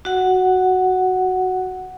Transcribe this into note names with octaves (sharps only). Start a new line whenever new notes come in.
F#4 F#5